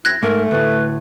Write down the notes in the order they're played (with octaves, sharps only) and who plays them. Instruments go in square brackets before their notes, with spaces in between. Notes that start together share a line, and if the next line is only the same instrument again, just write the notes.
[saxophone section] F#2 C4 E4 [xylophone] F#6 G#6 A#6
[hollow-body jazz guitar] G#2 [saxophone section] A3 [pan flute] A#4
[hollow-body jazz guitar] D2 A2 [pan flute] B4